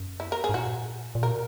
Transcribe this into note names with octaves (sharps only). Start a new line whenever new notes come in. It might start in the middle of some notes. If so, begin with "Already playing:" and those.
Already playing: F#2
E4
A#4
G#4
G#2
A#2 F#4
A#2
B2 A#4